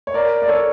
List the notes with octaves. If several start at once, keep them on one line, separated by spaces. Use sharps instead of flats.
C#5
A#4 D5
D5
A4 C#5